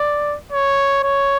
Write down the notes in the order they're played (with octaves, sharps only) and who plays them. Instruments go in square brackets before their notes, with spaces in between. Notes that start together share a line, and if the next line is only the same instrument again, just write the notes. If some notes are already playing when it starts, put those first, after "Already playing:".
Already playing: [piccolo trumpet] D5
C#5
C#5